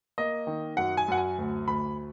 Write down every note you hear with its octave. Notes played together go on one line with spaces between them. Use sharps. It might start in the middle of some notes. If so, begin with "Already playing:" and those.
A#3 D#5
D#3
F#2 F#5
G#5
F#2 F#5
G#5
D2
D2 B5